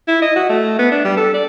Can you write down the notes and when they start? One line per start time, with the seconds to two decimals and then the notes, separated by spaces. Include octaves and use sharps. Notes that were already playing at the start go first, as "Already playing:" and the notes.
0.08 E4
0.22 D#5
0.36 F#4
0.50 A3
0.79 B3
0.91 D4
1.04 G3
1.17 A4
1.34 D5